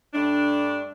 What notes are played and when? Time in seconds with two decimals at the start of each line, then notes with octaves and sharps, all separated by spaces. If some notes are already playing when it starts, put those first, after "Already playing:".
0.14 G2 A3 D4